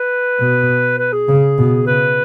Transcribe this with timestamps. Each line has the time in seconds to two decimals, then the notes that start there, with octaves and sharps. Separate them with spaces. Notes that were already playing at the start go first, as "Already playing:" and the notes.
Already playing: B4
0.40 B2
0.98 B4
1.13 G#4
1.29 C#3
1.58 B2
1.87 C#3 B4